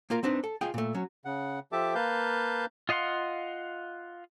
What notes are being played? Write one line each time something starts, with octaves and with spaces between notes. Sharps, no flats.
A#3 F4 A#4
C4 D4 D#4 B4
A4
F4 G#4 D#5 G5
A#2 A3
F#3 C#4
C#3 F#5
F3 G4 A4 E5 A5 D6
A#3 B4 F5 A5 G6
F4 D#5 F5 F#5 C6